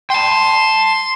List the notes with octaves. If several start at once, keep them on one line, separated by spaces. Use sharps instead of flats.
G5 A5 C6